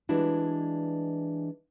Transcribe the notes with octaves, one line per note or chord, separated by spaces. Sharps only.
E3 G3 G#3 D4 E4 F#4